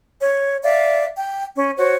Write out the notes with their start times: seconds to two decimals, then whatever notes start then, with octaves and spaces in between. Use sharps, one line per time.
0.22 C#5
0.63 D5 E5 F5
1.16 G5
1.56 C#4
1.78 F#4 C5 C#5